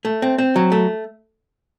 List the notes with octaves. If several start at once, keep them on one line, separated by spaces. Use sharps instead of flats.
A3
C4
C4
F#3
A3